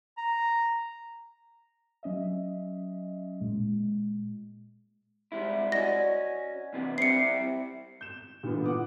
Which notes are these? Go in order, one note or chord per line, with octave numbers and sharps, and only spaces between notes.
A#5
F#3 C#4 D#5 E5
A#2 G#3
G3 G#3 E4
C#4 F#4 D5 D#5 A#6
C3 E3 B3
G3 C4 E4 C7 C#7
G6 E7
A#2 D3 E3 B3
F#5 D6 D#6